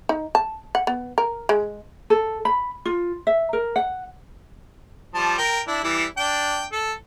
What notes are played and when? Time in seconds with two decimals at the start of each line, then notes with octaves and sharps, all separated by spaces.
0.09 D#4
0.35 A5
0.75 F#5
0.87 B3
1.18 A#4
1.49 G#3
2.10 A4
2.45 B5
2.85 F4
3.27 E5
3.53 A#4
3.76 F#5
5.15 F3 G3 A5
5.38 A#4 G5
5.67 D4 E4
5.84 E3 G3 E4
6.17 D4 G5
6.73 A4